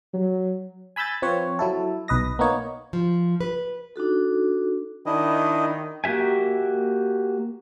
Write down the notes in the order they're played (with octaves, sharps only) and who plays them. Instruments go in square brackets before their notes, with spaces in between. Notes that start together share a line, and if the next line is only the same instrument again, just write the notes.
[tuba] F#3
[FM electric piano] G#5 B5 E6 G6 A6
F3 C4 F4 B4 C#5
F#3 E4 A4
B1 B4 D#5 A#6
A#3 B3 D#4 C#5
[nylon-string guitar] F3
B4
[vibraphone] D4 D#4 F#4 A4
[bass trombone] D#3 [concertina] D4 E4 D#5
[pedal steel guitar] A#3 F#4 G4 E5 G#5